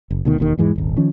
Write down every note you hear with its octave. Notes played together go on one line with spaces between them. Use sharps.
F#1
D2 B2 D#3
E1 D#2 D#3
E2 G#2 E3 G#3
D#1 G#1
D#3 F3 C#4